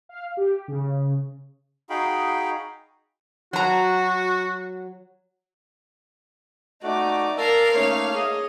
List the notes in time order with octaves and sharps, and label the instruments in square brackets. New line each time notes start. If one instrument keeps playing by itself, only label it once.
[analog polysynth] F5
G4
C#3
[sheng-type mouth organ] D#4 F#4 G#4 F5 G5 B5
[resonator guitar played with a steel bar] F#3 A#5 [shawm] F#4
[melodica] A3 F#4 [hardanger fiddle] D#4 [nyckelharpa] D5 D6
[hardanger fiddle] A#4 [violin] F5 F7 [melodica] A5 E6
[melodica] A3 A#3 [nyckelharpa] C#4 D#4 [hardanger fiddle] C#5
[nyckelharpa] G#4 D#5